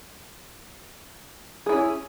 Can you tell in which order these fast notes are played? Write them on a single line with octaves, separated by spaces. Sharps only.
G#4 E4 C#4